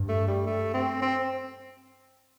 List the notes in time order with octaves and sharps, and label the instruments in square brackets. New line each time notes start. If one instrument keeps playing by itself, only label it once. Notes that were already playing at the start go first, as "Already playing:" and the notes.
Already playing: [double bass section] G2
[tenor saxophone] A3
G3
A3
C4
C4